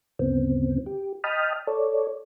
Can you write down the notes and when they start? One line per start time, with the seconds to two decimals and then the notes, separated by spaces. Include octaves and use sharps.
0.19 D2 G2 C#3 B3 C4
0.86 G4
1.24 D#5 G5 A5 B5 D#6 F6
1.67 A4 C#5 D5